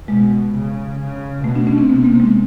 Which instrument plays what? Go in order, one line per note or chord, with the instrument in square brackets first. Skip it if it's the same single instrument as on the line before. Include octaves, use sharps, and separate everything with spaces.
[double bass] B2 [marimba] G#3
[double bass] C#3
C#3
[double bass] B2 [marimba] A3
[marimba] D4
C#4
C4
[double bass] C3 [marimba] B3
[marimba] A#3
G#3